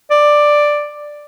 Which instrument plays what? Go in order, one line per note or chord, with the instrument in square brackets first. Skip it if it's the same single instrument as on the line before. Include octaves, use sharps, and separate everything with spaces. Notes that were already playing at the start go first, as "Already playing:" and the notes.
[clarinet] D5